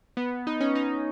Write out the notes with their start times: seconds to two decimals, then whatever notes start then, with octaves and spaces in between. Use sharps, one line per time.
0.17 B3
0.47 D#4
0.60 C#4
0.75 D#4